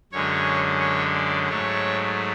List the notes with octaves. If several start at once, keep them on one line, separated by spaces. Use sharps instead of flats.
F#2 D3 G#3 C#5
C#5
D5
G#2 F#3 A3 C#5